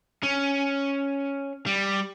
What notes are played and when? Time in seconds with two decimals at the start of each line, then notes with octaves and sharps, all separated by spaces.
0.23 C#4
1.66 G3